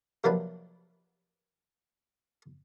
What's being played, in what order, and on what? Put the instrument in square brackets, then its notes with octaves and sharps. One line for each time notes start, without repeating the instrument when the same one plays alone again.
[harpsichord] C3 F3 F#3 A#3 D4 B4